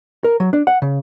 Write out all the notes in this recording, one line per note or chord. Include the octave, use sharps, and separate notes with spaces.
A#4
F#3
D4
F#5
C#3